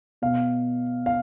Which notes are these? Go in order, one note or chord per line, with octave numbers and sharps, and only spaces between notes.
B2 F5
F5